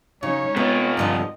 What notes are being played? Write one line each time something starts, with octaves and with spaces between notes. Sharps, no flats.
C#3 F#3 C#4 D#4 C#5
C3 G#3 B3 F4
G2 D3 F3 D#5